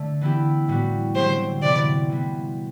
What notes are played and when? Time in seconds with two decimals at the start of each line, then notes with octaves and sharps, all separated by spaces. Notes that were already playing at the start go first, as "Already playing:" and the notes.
Already playing: D3 A3 D4
0.21 E3 B3 E4 G4
0.68 A2 G3 B3 F#4
1.15 D3 F#3 C4 G4 C5
1.63 C3 E3 B3 D5
2.09 E3 G3 B3